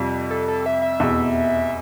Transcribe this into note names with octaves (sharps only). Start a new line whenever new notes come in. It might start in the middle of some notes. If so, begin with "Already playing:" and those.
Already playing: F2 C3 G3 F4
A4
A4
E5
E5
F1 E2 B2